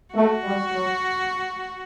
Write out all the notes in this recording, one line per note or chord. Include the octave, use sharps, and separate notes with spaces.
A3 F#4
G3
F#3